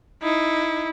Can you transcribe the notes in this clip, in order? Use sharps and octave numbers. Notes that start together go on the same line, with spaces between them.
D#4 E4